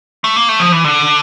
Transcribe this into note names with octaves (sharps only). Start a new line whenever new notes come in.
A3
A#3
A3
F3
E3
D3